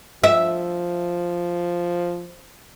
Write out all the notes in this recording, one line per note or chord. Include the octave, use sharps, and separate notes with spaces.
F3 E5